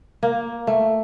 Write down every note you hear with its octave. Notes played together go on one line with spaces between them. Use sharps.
A#3
A3